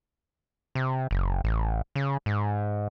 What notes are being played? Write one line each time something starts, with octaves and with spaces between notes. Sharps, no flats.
C3
F#1
A1
C#3
G#2